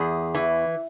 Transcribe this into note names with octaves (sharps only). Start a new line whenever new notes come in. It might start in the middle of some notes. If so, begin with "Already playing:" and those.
Already playing: E2 G#4
E3